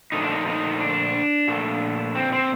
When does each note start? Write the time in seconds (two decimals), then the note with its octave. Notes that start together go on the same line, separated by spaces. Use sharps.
0.12 A#2 F3 A3 D#4
0.22 D4
0.30 D#4
0.46 D#4
0.80 D4
1.48 A#2 F3 A3
2.15 C4
2.32 C4